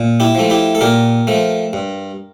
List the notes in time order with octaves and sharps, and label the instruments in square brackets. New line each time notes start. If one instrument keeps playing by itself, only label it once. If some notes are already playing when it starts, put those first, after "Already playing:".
Already playing: [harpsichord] A#2
E4 G4
F3 A3
E4 G4
A4
A#2 G4 A#4
F3 A3
G2